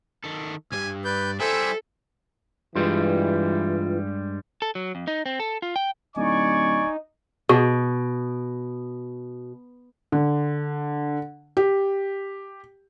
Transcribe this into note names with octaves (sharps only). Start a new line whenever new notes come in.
D#3 A4
B1 G2 G#5
B4 D5 G6
G3 E4 A4 C5 E5 G#5
G2 E3 G3 G#3 F4
A4
F#3
F2
D#4
C4
A4
F4
G5
D1 D#4 D5 G#5 C#6
B2 F#4 G#4
D3
G4